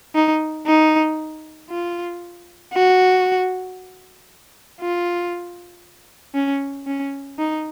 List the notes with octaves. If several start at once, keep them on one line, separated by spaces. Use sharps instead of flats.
D#4
D#4
F4
F#4
F4
C#4
C#4
D#4